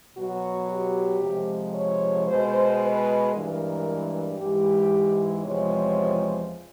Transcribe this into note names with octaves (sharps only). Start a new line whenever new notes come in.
B2 F#3 F#4
G4
F2 C3 F3 G#3
C#5
B2 G#3 C5
B4
G2 E3 G#3 A#4
G#2 E3 G#3 G4
E2 C3 F3 G#3 C#5